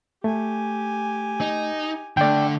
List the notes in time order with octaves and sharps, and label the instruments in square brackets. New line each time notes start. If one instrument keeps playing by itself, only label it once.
[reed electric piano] A3 [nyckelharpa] G4 G#5
[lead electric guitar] D#4
[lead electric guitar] D3 [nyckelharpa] A3 [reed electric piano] D5 G5